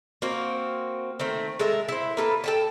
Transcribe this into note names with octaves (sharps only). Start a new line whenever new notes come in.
A#3 C4 F#4
D#3 A3 C4
G#3 A4 A#4 E5
E4 C5
A#3 A4 B4
A4 G5 A5